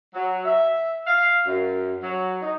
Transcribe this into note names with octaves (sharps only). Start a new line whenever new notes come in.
F#3
E5
F5
F#2
F#3
D#4